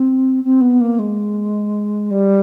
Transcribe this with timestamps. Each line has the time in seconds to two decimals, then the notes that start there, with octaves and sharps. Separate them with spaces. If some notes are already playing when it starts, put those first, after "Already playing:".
Already playing: C4
0.44 C4
0.61 B3
0.81 A#3
0.99 G#3
2.11 G3